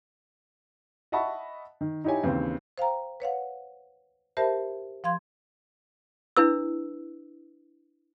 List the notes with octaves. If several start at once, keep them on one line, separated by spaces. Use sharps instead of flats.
D#5 E5 F#5 A5 B5 C#6
D#3
D#4 E4 G4 C#5 G#5
D#2 C#3 E3 C4
C5 F5 G5 A#5
B4 C#5 F5 F#5
G4 A#4 C5 E5 A5 B5
F3 F5 C6 G#6
D4 E4 B4 E6